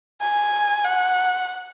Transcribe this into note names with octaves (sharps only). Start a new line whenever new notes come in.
G#5
F#5